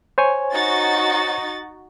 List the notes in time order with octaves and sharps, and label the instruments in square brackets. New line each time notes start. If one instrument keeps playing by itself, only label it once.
[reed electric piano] C5 C#5 G#5
[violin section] D#4 F#4 A6